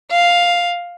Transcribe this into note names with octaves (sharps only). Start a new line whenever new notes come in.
F5